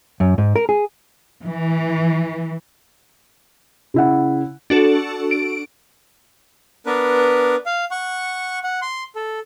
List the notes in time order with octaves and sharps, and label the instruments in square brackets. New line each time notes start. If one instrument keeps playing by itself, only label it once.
[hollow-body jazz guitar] F#2
G#2
A#4
G#4
[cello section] E3
[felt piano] C#3 E4 F#5
[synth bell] D4 F#4 A4
D7
[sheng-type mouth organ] B3 D4 A#4 B4
F5
F#5 C#6
F#5
C6
A4